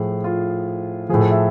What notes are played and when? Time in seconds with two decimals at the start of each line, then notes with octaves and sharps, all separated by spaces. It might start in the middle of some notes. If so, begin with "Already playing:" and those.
Already playing: A2 F3 G#4
0.24 F4
1.09 A2 F3 G#4
1.20 A4
1.31 E5